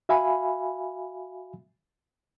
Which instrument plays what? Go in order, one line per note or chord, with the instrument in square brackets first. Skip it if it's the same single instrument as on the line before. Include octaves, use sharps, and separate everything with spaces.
[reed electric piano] F#4 E5 F5 G#5 B5